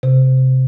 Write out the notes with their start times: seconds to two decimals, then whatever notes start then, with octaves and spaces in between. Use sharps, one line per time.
0.03 C3